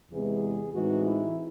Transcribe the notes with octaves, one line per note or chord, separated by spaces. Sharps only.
E2 C3 E3 G#3 B3 G#4
A2 E3 G#3 C4 D#4 F#4
E4